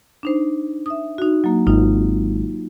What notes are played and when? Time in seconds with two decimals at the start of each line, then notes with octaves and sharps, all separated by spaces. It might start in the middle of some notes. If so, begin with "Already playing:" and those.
0.23 D4 D#4 C5
0.86 E5 D#6
1.18 D#4 F#4
1.44 F#3 A#3
1.67 G#1 D#4 F4